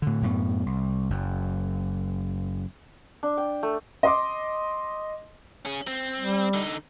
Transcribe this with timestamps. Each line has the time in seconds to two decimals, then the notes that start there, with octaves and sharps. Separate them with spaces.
0.02 A2 D3
0.22 F#2 A2 B3
0.66 C2
1.10 F#1 F#2
3.23 D4
3.37 G5
3.63 A3
4.03 D#5 C6 D6
5.65 C#4 G#4
5.87 C4
6.19 G3
6.54 D3 D#4